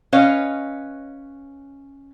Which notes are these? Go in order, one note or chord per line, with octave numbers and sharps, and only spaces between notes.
C#4 B4 C#5 D#5 F5